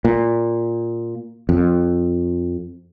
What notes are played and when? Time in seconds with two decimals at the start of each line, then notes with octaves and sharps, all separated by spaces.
0.05 A#2
1.49 F2